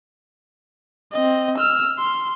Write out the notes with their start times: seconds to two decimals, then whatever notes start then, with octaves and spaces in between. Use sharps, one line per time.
1.13 C4 D#5
1.58 E6 F6
1.99 C6